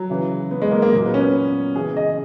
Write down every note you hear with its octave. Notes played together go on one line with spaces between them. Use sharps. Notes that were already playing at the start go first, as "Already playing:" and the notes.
Already playing: F#3
C#3 E3
B3
G#3
A#3
A#3
A#2 F#3
B3
C#4
B3
C#3 E3 G#4
D#5